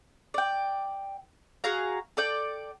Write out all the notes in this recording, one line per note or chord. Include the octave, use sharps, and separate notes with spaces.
D5 G5
F#4 G#4 F5 A#5
A4 D5 G5